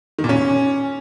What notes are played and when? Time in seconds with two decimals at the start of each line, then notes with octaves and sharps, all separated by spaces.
0.19 D#3
0.24 A#2
0.29 C#4